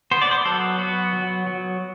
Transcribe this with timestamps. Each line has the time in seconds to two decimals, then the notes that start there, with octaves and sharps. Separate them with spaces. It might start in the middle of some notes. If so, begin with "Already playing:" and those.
0.11 B3 C5
0.22 D5
0.31 C5
0.45 F#3 A4
0.79 B3 F#4
1.13 F#3
1.47 F#3